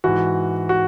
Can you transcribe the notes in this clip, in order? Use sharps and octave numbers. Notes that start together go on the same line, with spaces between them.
G#2 E3 F#4
F#4